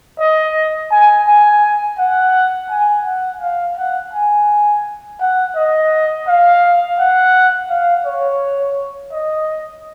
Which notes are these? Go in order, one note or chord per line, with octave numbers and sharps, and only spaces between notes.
D#5
G#5
G#5
F#5
G#5
F#5
F5
F#5
G#5
F#5
D#5
F5
F#5
F5
C#5
D#5